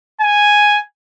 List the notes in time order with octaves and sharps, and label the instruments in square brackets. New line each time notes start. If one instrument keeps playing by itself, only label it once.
[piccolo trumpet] G#5